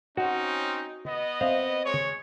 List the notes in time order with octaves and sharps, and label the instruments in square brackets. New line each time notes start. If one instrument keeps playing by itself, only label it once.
[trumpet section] C4 C#4 D#4 [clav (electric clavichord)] F#4
[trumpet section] B3 D#5
[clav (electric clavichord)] C4 E5 F5
[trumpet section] G#3 C#5